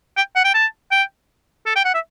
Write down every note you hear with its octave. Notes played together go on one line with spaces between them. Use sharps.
G5
F#5
G5
A5
G5
A4
G5
F#5
E5